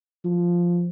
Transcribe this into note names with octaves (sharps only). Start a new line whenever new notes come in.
F3